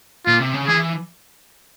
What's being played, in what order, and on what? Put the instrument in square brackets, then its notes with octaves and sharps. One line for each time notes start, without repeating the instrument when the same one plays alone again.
[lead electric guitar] A#2 [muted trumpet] F4
[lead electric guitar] C3
C#3
[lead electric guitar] E3 [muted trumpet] G#4